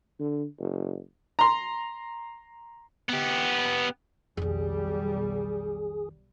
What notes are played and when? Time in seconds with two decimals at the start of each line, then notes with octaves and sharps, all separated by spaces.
0.20 D3
0.59 F#1
1.39 A#5 C6
3.10 B3 G4
4.37 B1 F2 D#3 G3 G#4